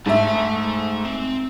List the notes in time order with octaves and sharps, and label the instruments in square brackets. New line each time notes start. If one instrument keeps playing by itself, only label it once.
[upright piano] G#2 E5 [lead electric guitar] A3 A5
[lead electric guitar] C4